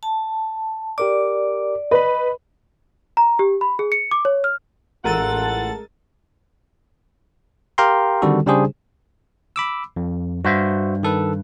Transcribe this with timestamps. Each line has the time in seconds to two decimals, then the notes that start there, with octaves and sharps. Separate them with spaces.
0.03 A5
0.98 G4 A#4 D5 D6
1.91 B4 D#5 B5
3.17 A#5
3.39 G4
3.61 B5
3.79 G#4
3.92 C#7
4.11 D6
4.25 C#5
4.44 F6
5.04 A1 G#3 F4 A4 A#4 F#5 A6 D#7
7.78 G4 A#4 F5 G5 A#5 C6
8.22 D3 D#3 G3 C4 F#4 A4
8.46 C#3 G3 D4 G4 G#4 C5
9.56 B5 D6 E6
9.96 F2
10.45 G2 F#4 C5 E5
11.03 D#3 A4 B4